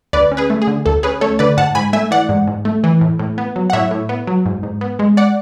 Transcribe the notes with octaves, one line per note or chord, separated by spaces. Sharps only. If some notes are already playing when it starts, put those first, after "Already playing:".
D2 B4 D5
C#4
G#4 B4
A3
G#4
D3
D2 A4
C#4 G#4 B4
A3 A4 C#5
D3 B4 D5
G#2 F#5 A5
G#2 G#5 B5
A3 E5 G#5
E3 D5 F#5
G#2
G#2
A3
E3
A2
A2
B3
F#3
F#5
A2 C#5 E5
A2
B3
F#3
G#2
G#2
B3
G#3
D5 F#5